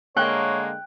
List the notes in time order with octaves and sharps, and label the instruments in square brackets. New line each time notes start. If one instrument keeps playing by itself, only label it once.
[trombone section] D3 G#3 A#3 [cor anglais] C#5 [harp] G5 F#6